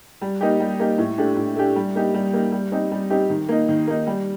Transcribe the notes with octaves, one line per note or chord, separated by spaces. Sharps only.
G3
A#3 D#4 G4
G3
A#3 D#4 G4
A2
A3 D4 G4
A2
A3 D4 G4
G3
A#3 D#4 G4
G3
A#3 D#4 G4
G3
C4 D#4 G4
G3
C4 D#4 G4
D#3
A#3 D#4
D#3
A#3 D#4
G3